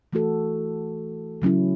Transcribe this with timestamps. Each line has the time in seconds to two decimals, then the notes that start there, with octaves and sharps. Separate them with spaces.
0.13 E3 A3 F#4 A4
1.42 C#3 F#3 C#4 E4